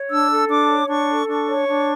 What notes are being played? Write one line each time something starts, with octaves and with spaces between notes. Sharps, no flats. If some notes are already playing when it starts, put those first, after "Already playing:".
Already playing: C#5
D4 E6
A4
D4 D6
C#5
D4 C#6
A4
D4 C#6
C#5
D4